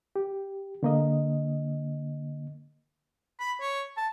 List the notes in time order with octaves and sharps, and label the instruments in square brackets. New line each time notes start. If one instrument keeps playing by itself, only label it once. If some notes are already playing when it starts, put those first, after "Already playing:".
[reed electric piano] G4
D3 A#3 D#5
[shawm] B5
C#5
A5